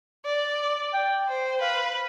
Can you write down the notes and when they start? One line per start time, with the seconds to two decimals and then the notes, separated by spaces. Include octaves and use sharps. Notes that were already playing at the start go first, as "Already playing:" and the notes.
0.25 D5
0.93 G5
1.28 C5
1.61 B4 F5